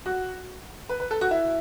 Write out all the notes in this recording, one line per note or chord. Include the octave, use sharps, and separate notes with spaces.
F#4
B4
B4
A4
F#4
E4